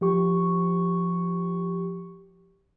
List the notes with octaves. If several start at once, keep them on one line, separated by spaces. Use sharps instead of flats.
F3 G4 C#6